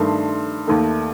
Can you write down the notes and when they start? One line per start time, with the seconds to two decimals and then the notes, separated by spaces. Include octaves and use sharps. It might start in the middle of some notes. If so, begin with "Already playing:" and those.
Already playing: G2 D#3 A3 C6
0.67 D#2 D#3 A3